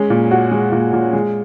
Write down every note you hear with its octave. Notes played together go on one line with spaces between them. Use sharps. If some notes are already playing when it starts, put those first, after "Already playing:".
Already playing: G#3 C#4
A#2
F#4
G#3
A#2
A#2
G#3